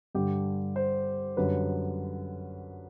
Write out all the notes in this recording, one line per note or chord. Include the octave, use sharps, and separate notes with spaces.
G2 D3 G3 G4
C5
F#2 D3 G3 B4